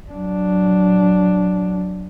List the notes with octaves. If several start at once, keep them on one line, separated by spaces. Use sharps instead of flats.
F#3 D4